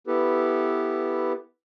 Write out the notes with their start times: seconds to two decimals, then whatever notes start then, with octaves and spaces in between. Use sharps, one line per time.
0.07 B3 E4 G4 A4 B4